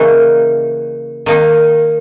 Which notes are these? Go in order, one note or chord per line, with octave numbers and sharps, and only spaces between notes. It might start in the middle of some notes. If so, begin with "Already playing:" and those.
Already playing: C#3 E3 A#3 D#4
D#3 A#3 D#4